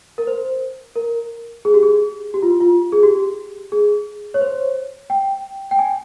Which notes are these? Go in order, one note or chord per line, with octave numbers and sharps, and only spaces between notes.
A#4
C5
A#4
G#4
G4
G#4
G4
F4
F4
G#4
G4
G#4
C#5
C5
G5
G5
G#5